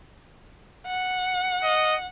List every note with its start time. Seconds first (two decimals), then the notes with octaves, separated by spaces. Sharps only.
0.87 F#5
1.63 D#5